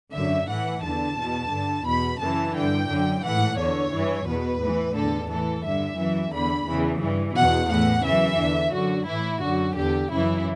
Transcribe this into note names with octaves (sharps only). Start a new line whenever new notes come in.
F#2 D3 E5
A2 E3 F#5
E2 D3 A5
E2 B2
G2 D3
E2 B2 B5
F#2 C#3 E3 A5
G2 D3 G5
F#2 D3
A2 E3 F#5
E2 D3 C#5
G2 E3
E2 B2 B4
A2 E3
E2 D3 A4
A2 E3 A4
G2 D3 E5
F#2 E3
E2 D3 B5
E2 C#3 E3
G2 E3
E2 B2 F#5
A2 E3 F#5
F#2 C#3 E3 E5
E2 D3
F#2 D3 F#4
A2 E3 E4
F#2 D3 F#4
E2 D3 G4
F#2 C#3 E3 E4